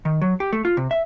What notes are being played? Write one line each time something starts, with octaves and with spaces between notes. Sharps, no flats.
D#3
F#3
G4
A3
F4
C3
E5